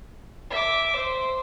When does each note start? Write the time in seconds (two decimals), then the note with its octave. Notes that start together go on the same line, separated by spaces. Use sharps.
0.51 E5 D6
0.96 C5